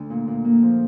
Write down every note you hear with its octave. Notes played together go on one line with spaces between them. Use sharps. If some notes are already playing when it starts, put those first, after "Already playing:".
Already playing: D2 D3 D4
A#2
A#2
A#3
F3